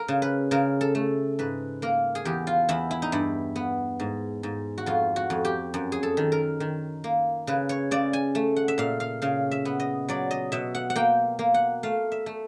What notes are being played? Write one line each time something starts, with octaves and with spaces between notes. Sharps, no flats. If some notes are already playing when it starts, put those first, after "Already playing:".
Already playing: A#4
C#3
B4
C#3 A#4
A4
A3
G#2 B4
A#3 A#4
G#4
E2 G4
F4
E2 E4
E4
D#4
G2 E4
B3
G#2
G#2
F#4
F2 F4
F#4
F2
G4
F#2
G#4
A4
D#3
A#4
D#3
A#3
C#3 B4
C#5
C#3 D5
G#5
A3
F#5
E5
A#2 F5
F5
C#3 F5
E5
B3
D#5
F#3 D5
D#5
B2 E5
F#5
F#5
A#3 G5
A#3
F#5
A3 F5
E5
A3